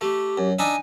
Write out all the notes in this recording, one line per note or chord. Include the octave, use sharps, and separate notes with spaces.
A3 G4
F#2
D4 D#4 E5 G#5